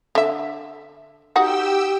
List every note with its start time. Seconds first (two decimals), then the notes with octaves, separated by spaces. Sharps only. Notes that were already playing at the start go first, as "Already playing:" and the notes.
0.15 D3 E5
1.36 D#4 F#4 G4 F#5 G5 E6